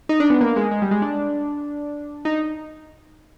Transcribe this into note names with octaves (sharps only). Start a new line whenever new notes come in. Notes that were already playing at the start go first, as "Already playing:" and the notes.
D#4
D4
B3
A#3
G#3
G#3
G3
G#3
D4
D#4